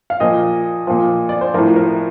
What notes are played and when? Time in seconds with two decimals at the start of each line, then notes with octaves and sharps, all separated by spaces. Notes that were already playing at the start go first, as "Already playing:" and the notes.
0.10 F5
0.20 A#2 F3 D#5
0.87 A#2 F3
1.29 D5
1.41 C5
1.54 A2 F3 A#4
1.76 A#4